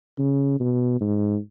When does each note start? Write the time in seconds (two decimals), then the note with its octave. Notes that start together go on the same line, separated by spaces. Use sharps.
0.19 C#3
0.60 B2
1.01 G#2